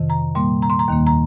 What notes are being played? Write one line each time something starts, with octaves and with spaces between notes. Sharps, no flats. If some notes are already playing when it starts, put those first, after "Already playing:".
Already playing: F2 C3 D#3
A#5
A#2 G3 A#3 C6
A#5
C6
A#5
D#2 D#3 A#3
A#5